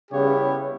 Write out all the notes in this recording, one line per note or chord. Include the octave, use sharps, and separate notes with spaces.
C#3 G3 B3 E4 G4 C#5